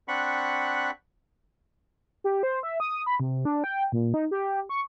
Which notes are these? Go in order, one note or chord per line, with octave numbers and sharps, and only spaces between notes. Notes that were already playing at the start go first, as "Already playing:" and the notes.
C4 D4 F#5 B5 C#6 F#6
G4
C5
E5
D#6
B5
C3
D4
G5
A#2
D#4
G4
C#6